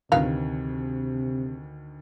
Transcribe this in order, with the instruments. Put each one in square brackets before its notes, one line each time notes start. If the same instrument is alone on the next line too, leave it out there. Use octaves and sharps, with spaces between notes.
[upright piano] D2 D#3 [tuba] C3 [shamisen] D#4 B4 F5